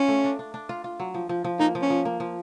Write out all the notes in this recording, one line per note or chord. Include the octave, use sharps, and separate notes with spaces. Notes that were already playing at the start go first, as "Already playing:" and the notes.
Already playing: C#4 F4
A3
D4
D4
D4
F4
F4
F#3
F3
F3
F3
A#3 D#4
F3
C#4
F3
A#3
F3